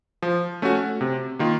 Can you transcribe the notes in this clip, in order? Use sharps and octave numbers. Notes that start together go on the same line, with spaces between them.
F3
A3 C#4 F#4
C3
D#3 A#3 F4